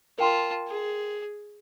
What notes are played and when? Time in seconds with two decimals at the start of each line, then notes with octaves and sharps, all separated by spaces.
0.18 F4 A#4 G5 A5 C6
0.67 G#4